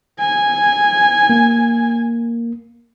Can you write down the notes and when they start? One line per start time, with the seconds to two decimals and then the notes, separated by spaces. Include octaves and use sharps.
0.20 G#5
1.29 A#3